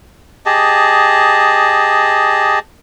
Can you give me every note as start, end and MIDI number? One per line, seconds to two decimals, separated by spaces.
0.46 2.59 67
0.46 2.59 68
0.46 2.59 75
0.46 2.59 81